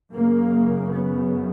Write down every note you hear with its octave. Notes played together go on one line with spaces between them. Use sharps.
F#2 C#3 A#3
B3